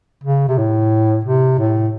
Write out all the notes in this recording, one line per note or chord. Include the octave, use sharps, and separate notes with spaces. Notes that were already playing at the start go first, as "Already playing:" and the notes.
C#3
C3
A2
C3
A2